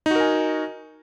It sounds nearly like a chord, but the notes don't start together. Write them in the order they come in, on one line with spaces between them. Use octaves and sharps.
D#4 F#4 A#4 G#5